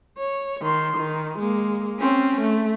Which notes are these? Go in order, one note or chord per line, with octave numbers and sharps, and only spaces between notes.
C#5
D#3 C6
D#3
G#3 A#3
C4 C#4
A3